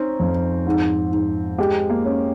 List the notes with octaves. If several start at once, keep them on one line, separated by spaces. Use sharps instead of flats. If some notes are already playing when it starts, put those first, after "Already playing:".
Already playing: C4 C#4 D#4
F2
G#2
G#2
G#3 G4
A#3
C#4